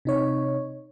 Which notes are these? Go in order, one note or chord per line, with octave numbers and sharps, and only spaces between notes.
C3 D#4 C#5